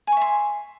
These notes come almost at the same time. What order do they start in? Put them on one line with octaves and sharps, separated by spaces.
G#5 C#6 E5 C6